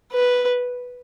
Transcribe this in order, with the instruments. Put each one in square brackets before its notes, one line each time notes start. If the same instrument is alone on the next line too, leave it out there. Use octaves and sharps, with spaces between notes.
[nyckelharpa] B4